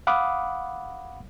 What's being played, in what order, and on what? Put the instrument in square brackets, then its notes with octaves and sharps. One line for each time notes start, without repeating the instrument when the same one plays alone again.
[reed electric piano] F5 F#5 B5 D6 D#6